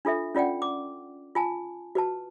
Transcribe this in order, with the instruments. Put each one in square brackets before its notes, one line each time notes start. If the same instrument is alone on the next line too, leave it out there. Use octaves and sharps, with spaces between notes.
[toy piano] D4 F4 A4 E5
C#4 F4 D5 F#5 G5
D6
F4 G#5 A5
F#4 B4 A5